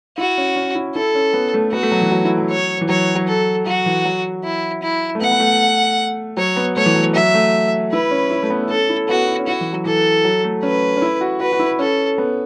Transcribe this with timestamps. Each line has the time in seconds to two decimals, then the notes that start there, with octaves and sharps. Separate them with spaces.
0.18 E4 F#4
0.38 C#4
0.56 C#4
0.75 E4
0.95 E4 A4
1.15 C#4
1.33 B3
1.54 A3
1.72 B3 F#4
1.83 A3
1.92 F#3
2.01 E3
2.12 F#3
2.25 E4
2.38 F#3
2.50 C#5
2.81 E3
2.89 F#3 C#5
3.15 F#3
3.28 A4
3.66 F#3 F#4
3.86 E3
4.05 F#3
4.44 E4
4.83 E4
5.15 A3
5.21 B3 F#5
5.31 B3
5.40 A3
6.37 F#3 C#5
6.57 B3
6.76 A3 C#5
6.86 E3
6.95 F#3
7.15 F#3 E5
7.34 A3
7.92 E4 B4
8.11 C#4
8.31 E4
8.43 A3
8.50 B3
8.63 E4
8.69 C#4 A4
8.90 E4
9.08 B3 F#4
9.27 E4
9.39 C#4
9.47 E4 F#4
9.61 E3
9.73 F#3
9.85 E3 A4
10.25 F#3
10.44 A3
10.63 C#4 B4
10.97 C#4
11.02 E4
11.21 F#4
11.40 F#4 B4
11.53 F#4
11.60 E4
11.79 C#4 A4
12.18 B3